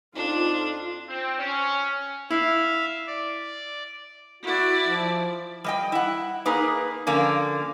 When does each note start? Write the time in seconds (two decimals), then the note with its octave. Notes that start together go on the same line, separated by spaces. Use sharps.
0.15 F2 D4 D#4 F4
1.08 C4
1.39 C#4
2.31 E4 E5 F5
3.07 D5
4.43 E4 F#4 D5
4.87 F3
5.64 G3 D#5 G5
5.92 E4 F#5
6.46 A#3 D#4 G#4 B4
7.07 D3 F3 A#3 C#4 D4